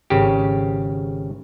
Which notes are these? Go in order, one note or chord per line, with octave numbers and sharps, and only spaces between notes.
G#1 C#3 G4